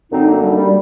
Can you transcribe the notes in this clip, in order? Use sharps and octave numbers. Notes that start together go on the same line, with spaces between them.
F#2 D3 C4 D#4
A#3 D4
G3 A#3
G3